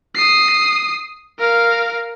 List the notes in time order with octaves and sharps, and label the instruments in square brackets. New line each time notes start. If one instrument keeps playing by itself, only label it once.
[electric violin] D#6 C7
A#4 F5